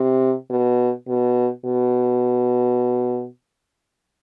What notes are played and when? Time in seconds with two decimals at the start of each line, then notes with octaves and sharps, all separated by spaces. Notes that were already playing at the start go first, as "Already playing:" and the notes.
Already playing: C3
0.50 B2
1.08 B2
1.65 B2